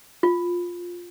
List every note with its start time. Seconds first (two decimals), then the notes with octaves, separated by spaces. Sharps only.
0.23 F4